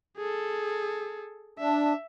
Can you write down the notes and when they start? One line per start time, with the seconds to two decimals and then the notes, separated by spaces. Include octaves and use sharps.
0.17 G#4 A4
1.59 D4 E5